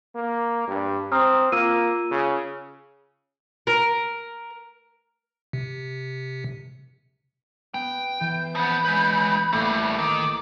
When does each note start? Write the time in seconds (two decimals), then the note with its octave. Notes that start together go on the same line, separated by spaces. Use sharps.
0.15 A#3
0.68 G2
1.12 C4 A#5 D#6 F6
1.52 A#3 F4 E6 D#7
2.11 C#3
3.67 A#4
5.53 C3
7.74 B3 G5
8.21 E3 G6
8.55 F3 B3 B5
8.85 G#3 B4
9.53 A1 G3 A3 A#3 C#6
9.98 D#3 D6